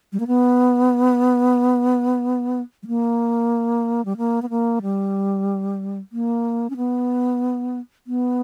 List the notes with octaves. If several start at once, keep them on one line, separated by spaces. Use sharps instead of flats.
G3
A#3
B3
G3
A#3
G3
A#3
B3
A#3
G3
A#3
C#4
B3
B3